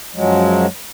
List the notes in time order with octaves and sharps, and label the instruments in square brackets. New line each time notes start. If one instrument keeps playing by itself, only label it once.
[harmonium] F#2 F3 F#3 G#3